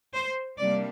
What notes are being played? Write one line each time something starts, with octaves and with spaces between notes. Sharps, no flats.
C5
C3 G3 A#3 D4 D5